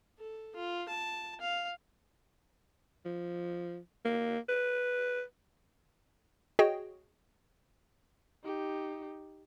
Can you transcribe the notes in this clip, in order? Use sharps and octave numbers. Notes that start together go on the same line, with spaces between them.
A4
F4
A5
F5
F3
A#3
B4
F#4 G#4 C#5 D#5 G5
D#4 G4